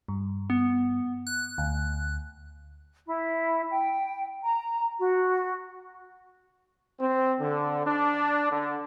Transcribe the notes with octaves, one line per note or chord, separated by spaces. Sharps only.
G2
B3
F#6
D2
E4
G5
A#5
F#4
C4
D3
D4
D3